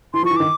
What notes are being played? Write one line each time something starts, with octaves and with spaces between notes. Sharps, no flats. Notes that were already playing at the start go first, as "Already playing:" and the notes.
E3 C6
F3 C#6
E3
D#3 D6